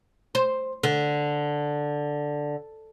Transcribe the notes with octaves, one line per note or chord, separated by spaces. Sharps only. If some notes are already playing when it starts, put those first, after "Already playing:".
C5
D3